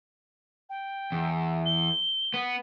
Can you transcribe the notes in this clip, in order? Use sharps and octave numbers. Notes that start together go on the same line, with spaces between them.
G5
E2
G7
B3